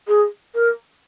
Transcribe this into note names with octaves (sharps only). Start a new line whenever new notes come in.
G#4
A#4